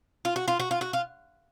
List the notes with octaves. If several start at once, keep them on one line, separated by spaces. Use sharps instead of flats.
F4
F#4
F4
F#4
F4
F#4
F4